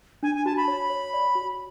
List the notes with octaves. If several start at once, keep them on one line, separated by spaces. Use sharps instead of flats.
D4 G#5
G#5
F#4 A5
B5
C#5
C#5
D5
F#4